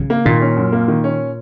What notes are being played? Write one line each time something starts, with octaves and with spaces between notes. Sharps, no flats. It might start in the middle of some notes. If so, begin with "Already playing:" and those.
Already playing: C#3
A#3
A#2 D#3
C#4
F#2
A#3
D#3
C#4